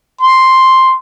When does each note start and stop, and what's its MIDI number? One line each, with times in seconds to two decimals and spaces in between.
0.20 0.95 84